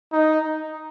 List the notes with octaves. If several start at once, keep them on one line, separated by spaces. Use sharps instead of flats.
D#4